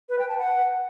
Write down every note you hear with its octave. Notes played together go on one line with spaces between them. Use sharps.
B4
G5
A5
F#5